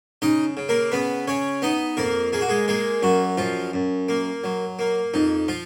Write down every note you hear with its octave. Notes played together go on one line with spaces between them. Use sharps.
C#3 D#4 D#5
C#3
A#3 A#4
C#3 B3 B4
C#3 C#4 C#5
B3 D#4 D#5
F2 A#3 A#4
A#3 G#4
F#4
G#3 G#4
G#3 A#3 G#4
F#2 F#3 F#4
F#2 F3 F4
F#2
A#3
F#3
A#3
F2 D#4
F3 F4